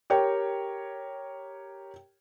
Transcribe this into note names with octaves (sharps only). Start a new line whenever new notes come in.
G4 A#4 C#5 G5